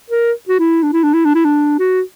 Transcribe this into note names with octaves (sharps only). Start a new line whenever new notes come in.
A#4
F#4
E4
D4
E4
D4
E4
D4
E4
D4
F#4